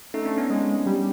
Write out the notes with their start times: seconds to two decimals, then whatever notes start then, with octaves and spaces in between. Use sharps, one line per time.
0.14 A3 C#4 D#4
0.25 C4 D4
0.37 B3 C#4
0.50 G#3
0.86 G3